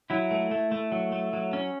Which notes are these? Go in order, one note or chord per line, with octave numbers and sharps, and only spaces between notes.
F#3 E4
A3
A3
A3
F#3
A3
F#3
C#4